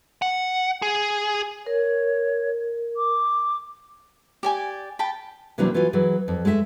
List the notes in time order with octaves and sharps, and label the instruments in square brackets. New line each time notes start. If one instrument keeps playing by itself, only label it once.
[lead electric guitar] F#5
G#4
[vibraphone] A#4 [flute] C#5
[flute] D6
[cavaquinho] G4 D5 G#5
G5 A5 B5
[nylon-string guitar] C3 E3 F#3 A#3 C4 D4
E3 F4 F#4 G#5
E3 F#3 G#4
F2
G#3 A3 G4 E5